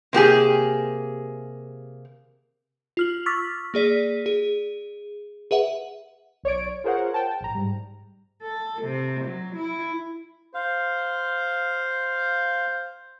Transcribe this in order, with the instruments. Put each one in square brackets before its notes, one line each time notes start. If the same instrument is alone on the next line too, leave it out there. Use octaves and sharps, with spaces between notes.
[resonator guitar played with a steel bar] C3 A#3 G4 G#4
[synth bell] F4 F6 F#7
C#6 D6 E6 F6 A6 B6
A#3 G#4 D5 B6 D#7
G#4
G#4 B4 E5 F#5
[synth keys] B1 C#5 D5 D7
F4 G#4 A#4 C5 C#5 F#5
G5 A5
A#1 A2 A#5
G#2 G3
[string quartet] A4
C3
F#3
E4
[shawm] C5 [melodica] F5